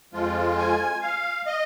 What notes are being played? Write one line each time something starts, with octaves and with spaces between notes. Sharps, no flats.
F2 F3 G#3 F4
G#5
F5
D#5